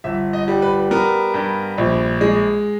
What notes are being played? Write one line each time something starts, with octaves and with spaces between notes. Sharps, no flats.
G1 E5
D#5
G3
B4
B3 A#4
G2
A#1
G#3